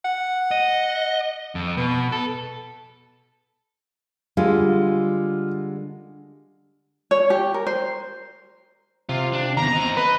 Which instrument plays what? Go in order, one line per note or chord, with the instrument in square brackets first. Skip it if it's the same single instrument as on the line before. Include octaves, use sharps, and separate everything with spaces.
[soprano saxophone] F#5
[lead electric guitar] D#5
F2
[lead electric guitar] B2 [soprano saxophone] B4
[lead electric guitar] A4
[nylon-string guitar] D3 G3 G#3 [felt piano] F4
[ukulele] C#5
G4
A#4
C5
[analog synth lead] C3 [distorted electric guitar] F4
[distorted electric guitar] D4
[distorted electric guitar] E2 D#3 [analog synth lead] A#5
[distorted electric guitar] C4 D#5
[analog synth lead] B4 [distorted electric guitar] D#5